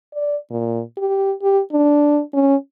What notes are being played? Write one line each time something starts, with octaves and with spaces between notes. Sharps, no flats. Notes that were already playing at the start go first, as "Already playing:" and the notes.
D5
A#2
G4
G4
D4
C#4